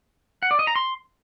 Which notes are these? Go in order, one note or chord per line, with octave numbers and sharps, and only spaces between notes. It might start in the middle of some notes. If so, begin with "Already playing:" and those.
F#5
D5
D#5
A#5
C6